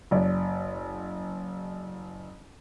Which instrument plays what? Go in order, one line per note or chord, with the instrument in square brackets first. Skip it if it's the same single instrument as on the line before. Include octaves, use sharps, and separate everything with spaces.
[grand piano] F#1 D5